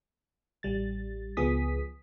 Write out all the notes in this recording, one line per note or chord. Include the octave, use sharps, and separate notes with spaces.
A1 G3 A6
C#2 F3 B3 G#4 D#6 B6